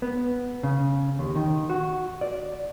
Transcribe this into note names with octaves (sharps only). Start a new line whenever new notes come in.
B3
C#3
D#2
D#3
F#4
D5